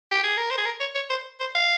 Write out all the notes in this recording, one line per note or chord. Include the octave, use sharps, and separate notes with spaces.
G4
G#4
A#4
C5
G#4
A#4
C#5
C#5
C5
C5
F5